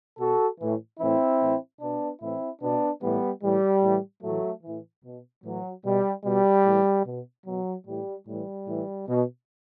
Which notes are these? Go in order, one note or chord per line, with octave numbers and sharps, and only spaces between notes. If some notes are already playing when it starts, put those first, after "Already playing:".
B2 F#4 A4
A2 E3
A2 E3 C4 E4
A2 E3
B2 B3 D4
A2 E3 C4 E4
B2 B3 D4
A2 E3 G3 B3
A2 E3 G3
A2 E3
A2 E3 F#3 A3
A2 E3
B2
A2 E3 F#3
B2 G3
B2 G3
A2 E3
B2
B2 F#3
A2 E3 G3
A2 E3 G3
A2 E3
B2